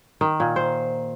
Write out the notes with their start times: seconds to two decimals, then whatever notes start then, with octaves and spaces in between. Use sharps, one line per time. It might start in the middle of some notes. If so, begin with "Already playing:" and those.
0.21 D#3
0.40 A#2
0.56 C5